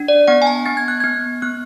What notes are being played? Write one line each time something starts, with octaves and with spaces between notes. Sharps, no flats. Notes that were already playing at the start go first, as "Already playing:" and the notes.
Already playing: D4
D5
B3 F#5
G#5
A5
B3 A6
G#6
F#6
B3 G#6
B3 F#6